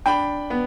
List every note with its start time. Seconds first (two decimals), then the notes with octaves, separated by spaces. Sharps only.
0.06 D4 G5 B5
0.50 B3